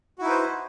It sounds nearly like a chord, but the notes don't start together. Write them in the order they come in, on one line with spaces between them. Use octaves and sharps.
F#4 E4 D#4 B4 C5